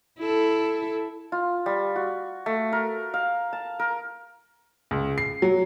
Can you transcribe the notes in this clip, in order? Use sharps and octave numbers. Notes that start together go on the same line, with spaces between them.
E4 A4
F4
G3
F#4
A3
A#4
F5
A5
A#4
C#2
C7
F#3